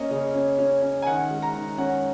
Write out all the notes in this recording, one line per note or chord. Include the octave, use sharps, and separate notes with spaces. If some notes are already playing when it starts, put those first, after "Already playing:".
Already playing: A#3 C#4 C#5 D#5
C#3 D#5
C#4
C#4
C#4
G#5
D#3 F#5
G#3
A#5
D#3
C#4 F#5